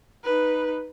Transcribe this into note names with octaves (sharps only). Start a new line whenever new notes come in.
D#4 B4